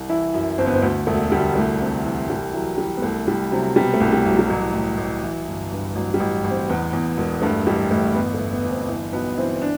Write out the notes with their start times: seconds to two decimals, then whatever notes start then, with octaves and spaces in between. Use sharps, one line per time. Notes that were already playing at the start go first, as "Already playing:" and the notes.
Already playing: C2
0.09 E3 E4
0.34 F#2
0.58 G1 C4
0.66 B3
0.74 C4
0.82 D2
1.07 E1 A3
1.32 D2 G3
1.55 C2 A3
1.81 C3
2.05 E3
2.29 C2 G3
2.53 E3 F#3
2.78 E3 G3
2.97 B3
3.02 C2 A3
3.27 C2 G3
3.52 C3 F#3
3.76 B2 G3
3.94 A3
4.00 C2
4.12 G3
4.25 C2
4.30 F#3
4.39 G3
4.46 A1 F#3
4.73 A2
4.97 A1
5.23 E3
5.47 G1
5.72 G2
5.95 A1 F#3
6.14 G3
6.20 A1
6.44 A1
6.51 C4
6.70 E2 B3
6.93 E2
7.17 E1
7.42 G2 A3
7.66 A1 G3
7.91 A1 A3
8.15 G1 B3
8.34 A3
8.40 G1
8.53 B3
8.65 G1
8.71 C4
8.88 E3
9.13 B1 B3
9.37 E3 C4
9.62 D4